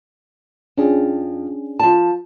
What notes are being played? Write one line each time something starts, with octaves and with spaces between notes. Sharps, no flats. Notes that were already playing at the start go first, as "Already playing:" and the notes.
F2 C#4 D4 G#4
F3 A5